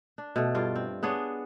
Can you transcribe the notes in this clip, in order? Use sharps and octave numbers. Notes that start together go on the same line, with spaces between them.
D4
B2 A3
G2 F4 D5
C4
B3 D4 G#4 C#5